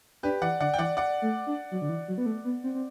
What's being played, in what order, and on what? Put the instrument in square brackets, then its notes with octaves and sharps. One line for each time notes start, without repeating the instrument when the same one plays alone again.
[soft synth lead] D4 [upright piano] G4 B4
[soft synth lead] E3 [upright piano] D5 F#5
[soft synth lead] D3 [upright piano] D5 F#5
[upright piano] G5
[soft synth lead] E3 [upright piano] D5 F#5
[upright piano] D5 F#5
[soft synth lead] A3
D4
F#3
D3
E3
F#3
B3
A3
B3
C4
C4